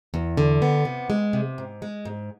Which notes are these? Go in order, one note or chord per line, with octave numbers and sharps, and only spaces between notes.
E2
D3
B3
C3
G#3
C3
G#2
G#3
G#2